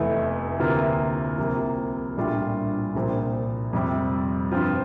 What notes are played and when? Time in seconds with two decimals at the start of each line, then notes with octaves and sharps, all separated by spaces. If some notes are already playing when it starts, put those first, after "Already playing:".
Already playing: F1 E2 E3 A3
0.59 D2 C3 E3 A#3 F4
1.38 C2 C3 F3 A#3
2.17 A#1 A2 G3 D4 F4
2.94 C2 A#2 F3 C4
3.73 F2 C3 G3
4.51 G2 F3 C4 F4